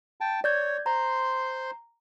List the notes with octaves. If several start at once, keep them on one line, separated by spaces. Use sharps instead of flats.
G5 A5
C#5 D5 G6 G#6
C5 A#5 C6